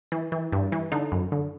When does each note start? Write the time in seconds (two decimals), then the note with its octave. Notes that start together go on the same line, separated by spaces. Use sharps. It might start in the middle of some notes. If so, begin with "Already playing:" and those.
0.12 E3
0.32 E3
0.52 G2
0.72 E3
0.92 D3 D#4
1.12 F#2
1.32 D3